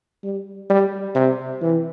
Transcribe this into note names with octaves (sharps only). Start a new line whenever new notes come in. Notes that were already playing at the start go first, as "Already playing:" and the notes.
G3
G3
C3
E3